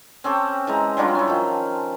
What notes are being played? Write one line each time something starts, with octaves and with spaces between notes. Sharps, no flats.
C4 C#4 G4 A4
E3 G#3 A#5
F#3 G3 D4 F4
C#4 E4
D#3 F3